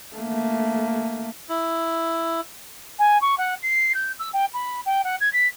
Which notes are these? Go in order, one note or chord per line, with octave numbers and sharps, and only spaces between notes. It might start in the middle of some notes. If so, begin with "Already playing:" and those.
A3 A#3
E4
G#5
C#6
F#5
C7
G6
E6
G5
B5
G5
F#5
G#6
B6